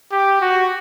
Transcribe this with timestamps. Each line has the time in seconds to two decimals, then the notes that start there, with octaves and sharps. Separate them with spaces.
0.12 G4
0.41 F#4